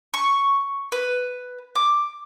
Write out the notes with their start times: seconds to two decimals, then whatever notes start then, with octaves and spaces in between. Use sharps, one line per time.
0.14 C#6
0.92 B4
1.75 D6